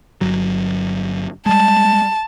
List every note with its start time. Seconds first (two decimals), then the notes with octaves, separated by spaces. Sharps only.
0.21 G1 F#3
1.46 G3 G#3 A5